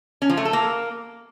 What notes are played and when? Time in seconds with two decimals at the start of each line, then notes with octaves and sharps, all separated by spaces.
0.22 C#4
0.30 F3
0.37 A3
0.45 A4
0.53 A#3